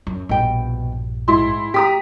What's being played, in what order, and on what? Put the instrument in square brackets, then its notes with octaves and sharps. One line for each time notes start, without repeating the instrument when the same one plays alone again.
[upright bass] F#2
[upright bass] A#1 G2 [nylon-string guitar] B2 G5
[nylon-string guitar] G#2 [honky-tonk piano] E4 C6
[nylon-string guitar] G4 [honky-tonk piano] A#5 D#6 B6